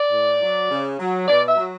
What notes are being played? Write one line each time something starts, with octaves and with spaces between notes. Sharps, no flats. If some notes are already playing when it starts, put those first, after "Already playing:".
Already playing: D5
A2
F#3
C#3
F#3
B2 D5
E5
F#3